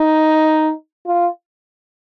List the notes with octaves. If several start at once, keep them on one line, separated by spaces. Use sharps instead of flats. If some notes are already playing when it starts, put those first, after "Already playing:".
Already playing: D#4
F4